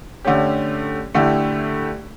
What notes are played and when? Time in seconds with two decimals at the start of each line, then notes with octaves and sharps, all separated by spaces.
0.25 D3 A3 C#4 G4
1.14 D3 A3 E4 G4